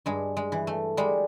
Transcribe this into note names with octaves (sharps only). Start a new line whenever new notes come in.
G2 G#3
G#3
E3
A3
G3 G#3